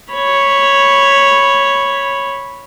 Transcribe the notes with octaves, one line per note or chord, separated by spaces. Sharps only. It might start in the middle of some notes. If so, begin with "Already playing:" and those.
C#5 B5